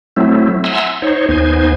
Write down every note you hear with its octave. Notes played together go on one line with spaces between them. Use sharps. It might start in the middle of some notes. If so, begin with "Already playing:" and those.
F#3 A3 C4 E4
E5 F#5 G#5 A#5 C6 E6
D#4 C5 C#5
D#2 B3 D#4 C5 G#5